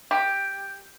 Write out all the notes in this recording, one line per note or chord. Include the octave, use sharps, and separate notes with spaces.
G4